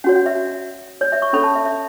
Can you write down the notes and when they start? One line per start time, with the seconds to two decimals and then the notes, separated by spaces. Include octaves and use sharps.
0.04 C#4 F#4 C#5 F#5
0.15 F#5
0.26 E5
1.01 C#5
1.12 E5
1.22 C#6
1.33 C#4 A4 C#5 B5
1.44 A5
1.55 E5
1.65 E5